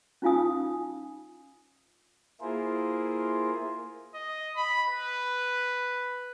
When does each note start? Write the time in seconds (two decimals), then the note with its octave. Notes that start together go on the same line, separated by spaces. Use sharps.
0.22 C#4 D#4 F4 F5 G#5 D#6
2.41 A#3 E4 F4 G#4 A#4 C5
4.15 D#5
4.56 B5
4.89 B4